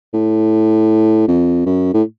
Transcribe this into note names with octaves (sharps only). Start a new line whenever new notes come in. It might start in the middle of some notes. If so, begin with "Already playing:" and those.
A2
F2
F#2
A2